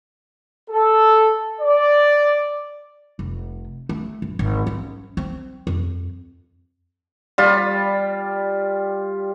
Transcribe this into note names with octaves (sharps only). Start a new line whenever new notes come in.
A4
D5
F1
A3
G1
G#1
C#4
C4
F2
G3 F4